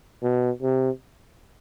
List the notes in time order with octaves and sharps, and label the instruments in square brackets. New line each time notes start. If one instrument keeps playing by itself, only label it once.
[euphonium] B2
C3